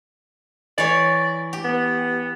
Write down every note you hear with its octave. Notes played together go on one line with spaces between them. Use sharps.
E3 C#5 D5
G4
B3